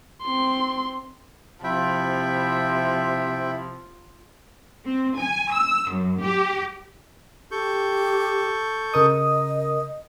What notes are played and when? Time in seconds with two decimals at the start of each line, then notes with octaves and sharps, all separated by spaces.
0.23 C4 C6
1.64 C3 F3 E4 E5 G5 B5
4.85 C4
5.18 G#5
5.53 E6
5.90 F#2
6.22 G4
7.51 G4 A4 C#6 G6
8.94 C#3 A#4 D#5 D#6